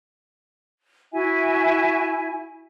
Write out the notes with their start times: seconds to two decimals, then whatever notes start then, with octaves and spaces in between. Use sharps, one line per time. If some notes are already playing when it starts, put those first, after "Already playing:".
1.13 E4 F#4 E5 G#5